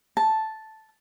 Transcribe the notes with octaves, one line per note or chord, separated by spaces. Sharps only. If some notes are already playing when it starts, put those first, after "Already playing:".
A5